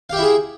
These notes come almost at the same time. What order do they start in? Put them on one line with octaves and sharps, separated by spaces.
F5 G4 E5 E4 G#4